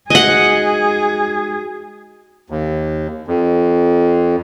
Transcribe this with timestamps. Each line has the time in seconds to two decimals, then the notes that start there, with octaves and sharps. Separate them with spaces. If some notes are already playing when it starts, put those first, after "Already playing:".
0.10 G#3 D#4 F#4 G#4 D#5 F#5
2.50 D#2
3.28 F2